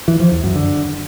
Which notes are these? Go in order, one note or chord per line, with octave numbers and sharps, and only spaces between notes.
E3
F3
E2
F#2
D3